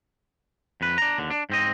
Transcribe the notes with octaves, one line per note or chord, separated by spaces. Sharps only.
F2 B4
D4 A#5
D#2 D3
D4
G#2 C4 D#5